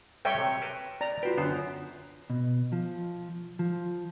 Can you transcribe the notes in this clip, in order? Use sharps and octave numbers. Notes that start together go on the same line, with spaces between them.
G3 A4 C#5 E5 G5 G#5
C3
A#4 B4 A5
D5 A#5
F4 F#4 B4 C5 G5
F#2 D3 B3 C5
B2
F3
F3